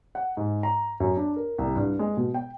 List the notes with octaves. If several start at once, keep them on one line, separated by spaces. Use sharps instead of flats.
F#5
G#2
A#5
F#2
D4
A#4
C2
G2
G#3
B2
G5